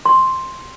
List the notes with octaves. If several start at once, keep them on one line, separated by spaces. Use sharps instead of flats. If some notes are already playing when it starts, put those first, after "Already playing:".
C6